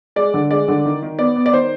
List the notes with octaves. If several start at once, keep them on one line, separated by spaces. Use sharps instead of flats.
G#3 D5
D3
G#3 D5
D3
D#3
D#3
B3 D5
B3
D5
D#3 C5